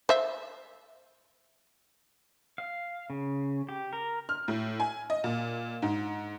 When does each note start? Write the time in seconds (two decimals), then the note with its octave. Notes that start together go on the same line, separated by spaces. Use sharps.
0.09 C5 E5
2.58 F5
3.10 C#3
3.69 G4
3.93 A#4
4.29 F6
4.48 A2
4.80 G#5
5.10 D#5
5.24 A#2
5.82 G#2